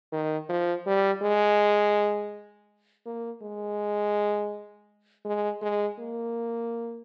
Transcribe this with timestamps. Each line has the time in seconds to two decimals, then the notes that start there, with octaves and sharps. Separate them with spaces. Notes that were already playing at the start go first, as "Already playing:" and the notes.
0.12 D#3
0.49 F3
0.86 G3
1.22 G#3
3.06 A#3
3.42 G#3
5.25 G#3
5.62 G#3
5.99 A#3